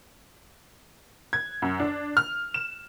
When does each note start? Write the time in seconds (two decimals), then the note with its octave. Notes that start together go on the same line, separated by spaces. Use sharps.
1.33 G#6
1.62 F#2
1.80 D4
2.17 F6
2.54 E7